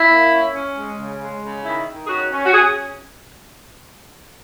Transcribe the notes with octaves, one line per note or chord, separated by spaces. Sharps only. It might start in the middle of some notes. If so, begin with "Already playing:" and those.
Already playing: E4
A#3
C#4
C#4
G#3
C#3
G#3
C#3
D#3 E4
D#3
G#4
C#4 F#4
C#4
F#4
C#4 G#4